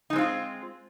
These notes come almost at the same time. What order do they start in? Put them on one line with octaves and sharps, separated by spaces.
D#4 G#3 C4 F4 G#4